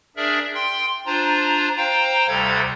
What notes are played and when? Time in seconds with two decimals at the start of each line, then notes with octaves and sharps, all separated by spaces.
0.16 D4 G#4 A#4 D5 E5
0.54 G5 C6
1.06 D4 F4 C5 A#5
1.77 C5 F5 G5 A#5
2.28 D2 C3 G3 A4 A#5 G#6